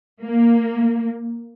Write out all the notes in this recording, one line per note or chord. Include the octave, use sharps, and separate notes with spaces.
A#3